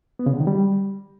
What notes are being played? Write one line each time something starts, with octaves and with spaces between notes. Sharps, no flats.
B3
C#3
D3
D#3
G3